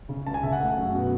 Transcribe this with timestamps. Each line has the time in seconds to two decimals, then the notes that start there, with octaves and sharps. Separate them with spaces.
0.09 C#3
0.26 C#2 A5
0.34 G#5
0.43 C#3 E5
0.52 F#5
0.61 A3
0.77 F#2
0.95 B2